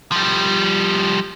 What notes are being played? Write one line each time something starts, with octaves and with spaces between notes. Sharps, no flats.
F3 G3